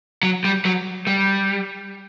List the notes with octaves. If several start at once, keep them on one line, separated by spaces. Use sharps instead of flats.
F#3
G3
F#3
G3